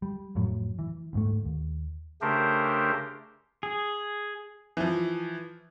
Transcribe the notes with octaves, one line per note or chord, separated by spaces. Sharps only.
G3
F2 A2 F#3
E3
D2 G#2 A3
D#2
C#3 A3 D4 G4 A#4 C5
G#4
E3 F3